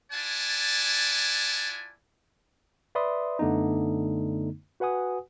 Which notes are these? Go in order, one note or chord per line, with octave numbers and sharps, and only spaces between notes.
E4 F4 D5 F#5 G#5 A5
B4 D5 E5 B5 C6 D#6
F#2 D3 A3 B3 D#4
F#4 B4 F#5 G#5 D#6